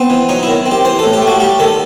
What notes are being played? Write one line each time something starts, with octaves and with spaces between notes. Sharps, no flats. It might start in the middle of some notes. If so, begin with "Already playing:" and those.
Already playing: B3 C4
E3
F#3 D#4
D#3 E4
C4
G4
E3 C5
A2 A4
G4
A3
F#4
G3 G4
D#3 A4